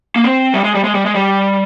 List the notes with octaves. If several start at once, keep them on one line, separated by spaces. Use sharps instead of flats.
A#3
C4
G3
G#3
G3
G#3
G3
G#3
G3